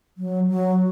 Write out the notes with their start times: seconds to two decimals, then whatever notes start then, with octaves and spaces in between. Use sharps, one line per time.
0.18 F#3
0.50 F#3